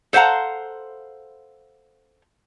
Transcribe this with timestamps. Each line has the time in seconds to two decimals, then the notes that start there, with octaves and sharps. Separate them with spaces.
0.13 A4 C5 F5 F#5 A#5